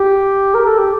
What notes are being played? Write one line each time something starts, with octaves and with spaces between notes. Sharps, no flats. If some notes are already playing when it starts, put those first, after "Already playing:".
Already playing: G4
A#4
A4
G4